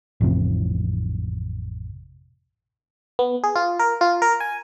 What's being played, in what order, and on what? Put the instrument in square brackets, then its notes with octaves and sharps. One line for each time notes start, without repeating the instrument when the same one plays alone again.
[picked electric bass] A1 F2 C3
[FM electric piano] B3
G#4
F4
A#4
F4
A#4
G#5